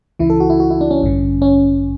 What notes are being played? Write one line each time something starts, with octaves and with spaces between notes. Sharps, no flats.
C#2 C#3 E3 E4
A4
F#4
E4
F#4
E4
D4
C#4
A1 G2 D3
C#4